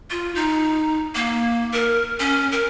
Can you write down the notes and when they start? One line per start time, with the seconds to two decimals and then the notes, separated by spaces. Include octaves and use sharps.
0.10 F4
0.35 D#4
1.15 A#3
1.73 A#4
2.20 C#4
2.52 A#4